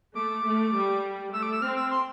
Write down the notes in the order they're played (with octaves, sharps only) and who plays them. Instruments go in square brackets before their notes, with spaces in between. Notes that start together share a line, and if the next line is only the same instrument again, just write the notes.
[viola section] A3 [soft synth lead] D6
[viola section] A3
G3
[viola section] A3 [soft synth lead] E6
[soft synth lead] D6
E6
[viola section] C4 [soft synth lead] F6
[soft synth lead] E6
C6